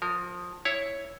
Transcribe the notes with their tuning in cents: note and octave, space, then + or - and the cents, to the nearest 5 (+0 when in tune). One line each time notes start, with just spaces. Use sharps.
F3 +20 A#4 -20
E4 +0 C#5 +0